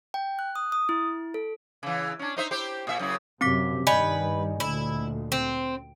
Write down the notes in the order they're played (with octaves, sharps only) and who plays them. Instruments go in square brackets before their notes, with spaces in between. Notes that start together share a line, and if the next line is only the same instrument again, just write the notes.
[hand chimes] G5
F#6
D#6
D#6
E4
A4
[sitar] C#3 E3
C#4 D4
D#4 C5 E5
E4 G4 C5
A#2 E5
F#2 C#3 E4
[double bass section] F#2 C3 [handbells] C4 D6 B6
[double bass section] G2 D#3 [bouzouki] B4 [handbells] D5 D#5 G#5
[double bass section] D2 A#2 [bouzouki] E4
[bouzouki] C4